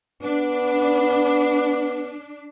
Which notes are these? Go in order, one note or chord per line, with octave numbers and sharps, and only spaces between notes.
B3 D4